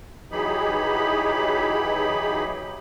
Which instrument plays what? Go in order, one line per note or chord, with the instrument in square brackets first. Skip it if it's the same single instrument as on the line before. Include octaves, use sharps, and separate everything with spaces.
[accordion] E3 F#3 D#4 G4 G#4 B5